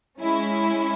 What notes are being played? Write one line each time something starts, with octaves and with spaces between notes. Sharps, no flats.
G#3 C#4 E4